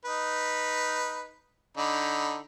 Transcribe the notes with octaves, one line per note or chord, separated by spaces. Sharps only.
D#4 B4
D3 D#4 B5